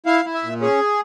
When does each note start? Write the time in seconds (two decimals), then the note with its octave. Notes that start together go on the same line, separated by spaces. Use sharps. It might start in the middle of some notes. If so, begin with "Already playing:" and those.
0.06 E4 F5
0.25 E4
0.34 E5
0.43 A#2
0.61 C#4 G#4